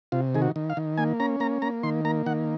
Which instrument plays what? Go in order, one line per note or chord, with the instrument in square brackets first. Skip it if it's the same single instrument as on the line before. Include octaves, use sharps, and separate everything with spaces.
[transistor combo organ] C3 F4
D#3 G#4
F#4
D#3
F5
D#3
A#3 G#5
C#4 A#5
A#3 A#5
A#3 A#5
D#3 C6
A#3 A#5
D#3 F#5